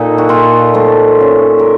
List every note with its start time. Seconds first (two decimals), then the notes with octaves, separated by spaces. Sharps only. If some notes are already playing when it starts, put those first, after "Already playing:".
Already playing: A#2 D#4 A4
0.18 F#4
0.29 A#2 F4 A4
0.74 A3 A4 C5
1.21 C#4
1.59 A#4